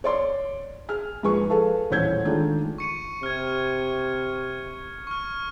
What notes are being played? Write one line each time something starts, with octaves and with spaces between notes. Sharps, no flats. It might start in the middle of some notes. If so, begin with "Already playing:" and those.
C#5 D5 C6
G#4 F6
G#2 F3 G#4 B4 C#6
G#4 A4 B4 F5 A5
D#1 A1 C#5 G6 G#6
D#3 G#3 A3 D4 F4
C#6 C#7 D#7
C3 F6 G#6
C#6 F6